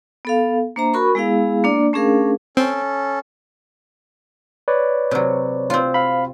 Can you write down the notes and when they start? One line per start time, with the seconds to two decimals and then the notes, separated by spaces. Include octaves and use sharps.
0.25 B3 A4 F5
0.76 A#3 D4 C5 E5 A#5
0.94 F#4 A#4 B5 C#6
1.15 G#3 B3 E4 G#4 F5
1.64 A#3 D4 D5
1.93 A3 C#4 D4 G#4 A#4 F5
2.57 C4 C#4 A4
4.68 B4 C#5 D5
5.11 C3 F#3
5.70 C4 F4
5.94 F5 B5